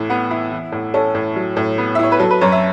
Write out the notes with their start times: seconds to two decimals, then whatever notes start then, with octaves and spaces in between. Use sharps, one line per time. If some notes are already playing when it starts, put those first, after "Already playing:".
Already playing: A2 E3
0.09 B3 F#5
0.31 E4
0.52 E3
0.72 A2
0.94 C#4 A4
1.15 A2
1.36 F#3
1.57 A2
1.78 B3
1.95 E5
1.99 E4 C#5
2.12 B4
2.20 F#3 A4
2.31 B4
2.41 F#2 C#5
2.52 E5